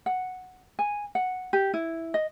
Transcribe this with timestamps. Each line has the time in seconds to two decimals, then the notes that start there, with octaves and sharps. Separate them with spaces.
0.06 F#5
0.79 G#5
1.15 F#5
1.53 G4
1.74 E4
2.14 D#5